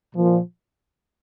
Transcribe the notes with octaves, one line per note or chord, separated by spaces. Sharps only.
A#2 F3